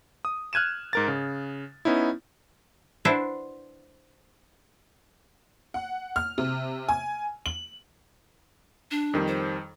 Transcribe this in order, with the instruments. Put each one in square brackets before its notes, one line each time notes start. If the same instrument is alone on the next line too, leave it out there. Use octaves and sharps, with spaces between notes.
[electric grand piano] D#6
F6 F#6 G#6 D#7 E7
G#2 A#4 A6
C#3
B3 C#4 D#4 E4
[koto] D4 E4 B4 C5 E5 F#5
[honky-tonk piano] F#5
F6
C3
G#5
F#7
[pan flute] D4
[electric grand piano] F2 D#3 G3
[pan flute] C5